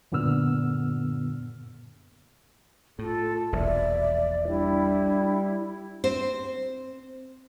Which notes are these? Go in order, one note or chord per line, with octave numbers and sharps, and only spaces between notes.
F#2 A#2 D3 B3 E6 F6
A2 F4 A4
E1 A#1 D5 E5
G3 D4 E4
C4 C5